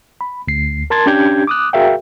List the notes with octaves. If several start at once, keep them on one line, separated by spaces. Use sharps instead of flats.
B5
D2 C7
A#4 A5 C6 G#6 A6
C#4 D4 G4 G6 G#6
D6 D#6 F#6
F#4 G#4 A#4 E5 F5 G5